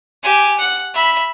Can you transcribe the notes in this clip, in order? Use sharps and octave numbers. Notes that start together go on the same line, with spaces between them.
G4 G#5
F#5
E5 B5